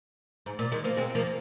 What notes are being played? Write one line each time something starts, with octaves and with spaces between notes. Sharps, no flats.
G#2
A#2
D#3 G#3
F3 A#3
G#3 C4
F3 A#3